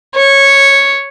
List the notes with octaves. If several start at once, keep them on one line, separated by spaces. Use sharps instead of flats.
C#5